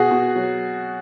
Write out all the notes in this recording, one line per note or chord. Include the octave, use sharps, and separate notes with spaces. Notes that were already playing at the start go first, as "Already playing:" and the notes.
Already playing: B2 F#4 G#4
B2
F#3